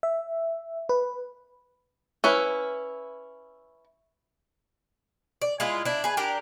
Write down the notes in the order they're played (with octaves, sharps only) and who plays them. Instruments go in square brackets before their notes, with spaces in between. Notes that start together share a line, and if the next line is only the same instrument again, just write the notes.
[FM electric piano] E5
B4
[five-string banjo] C#4 E4 B4
[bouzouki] D5
G#3 E4 F4
D4 E4
G#4 B4
D4 G4 A#4